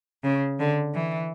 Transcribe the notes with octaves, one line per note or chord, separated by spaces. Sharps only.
C#3
D3
E3